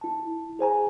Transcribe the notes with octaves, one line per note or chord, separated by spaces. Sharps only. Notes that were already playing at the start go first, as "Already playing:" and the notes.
E4 A5
G#4 C5 G#5 A#5